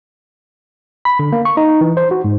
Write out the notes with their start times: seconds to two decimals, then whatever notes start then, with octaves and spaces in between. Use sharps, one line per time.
1.05 B5
1.19 D3
1.33 A#3
1.45 C#6
1.57 D#4
1.81 E3
1.97 C5
2.11 F#4
2.24 G#2